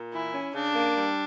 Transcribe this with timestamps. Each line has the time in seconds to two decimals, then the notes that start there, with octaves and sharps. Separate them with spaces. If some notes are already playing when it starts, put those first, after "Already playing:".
Already playing: A#2
0.13 E3 E4
0.34 C#4
0.55 C#3 D4
0.75 A#3
0.95 G3